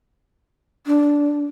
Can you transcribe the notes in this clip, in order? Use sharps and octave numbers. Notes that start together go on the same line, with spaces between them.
D4